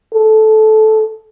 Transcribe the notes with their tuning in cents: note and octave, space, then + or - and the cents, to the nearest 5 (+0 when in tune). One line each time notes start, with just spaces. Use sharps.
A4 -15